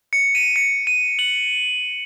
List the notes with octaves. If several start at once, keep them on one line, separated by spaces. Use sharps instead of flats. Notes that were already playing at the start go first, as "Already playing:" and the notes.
C#7
D#7
C#7
D#7
F#7